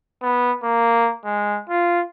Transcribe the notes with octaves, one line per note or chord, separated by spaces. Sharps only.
B3
A#3
G#3
F4